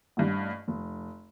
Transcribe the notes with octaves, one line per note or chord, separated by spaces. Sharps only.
A1 G2 G3
F1